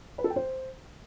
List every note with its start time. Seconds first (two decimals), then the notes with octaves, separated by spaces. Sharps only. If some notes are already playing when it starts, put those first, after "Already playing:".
0.18 B4
0.24 A4
0.30 G5
0.36 C5